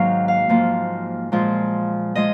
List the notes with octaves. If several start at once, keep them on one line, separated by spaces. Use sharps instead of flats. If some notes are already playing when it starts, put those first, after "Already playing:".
Already playing: G#2 D#3 F#3 A#3 F5
F5
G#2 F3 A#3
A#2 F3 G#3
F3 G#3 D#5